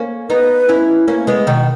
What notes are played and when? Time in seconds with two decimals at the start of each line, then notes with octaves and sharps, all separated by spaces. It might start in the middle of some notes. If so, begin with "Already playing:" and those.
Already playing: A#3 C#4
0.30 B3 D#4 B4
0.69 C#4 E4
1.08 A#3 C#4
1.27 G#3 B3
1.47 B2 D#3